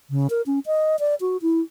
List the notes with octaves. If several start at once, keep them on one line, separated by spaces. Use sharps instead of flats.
C#3
A#4
C#4
D#5
D5
F#4
E4